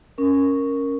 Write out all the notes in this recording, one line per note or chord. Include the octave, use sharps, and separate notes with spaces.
C#4 A#4